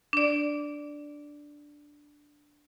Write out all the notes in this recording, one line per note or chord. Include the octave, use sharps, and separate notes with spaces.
D4 D5